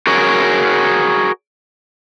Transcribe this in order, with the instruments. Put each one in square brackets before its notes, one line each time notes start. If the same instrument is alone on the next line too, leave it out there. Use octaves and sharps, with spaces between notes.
[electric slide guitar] F#4 G#4 A#4 C#5